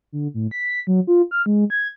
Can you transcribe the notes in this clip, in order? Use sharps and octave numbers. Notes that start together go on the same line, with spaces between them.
D3
A2
B6
F#3
F4
F6
G#3
G#6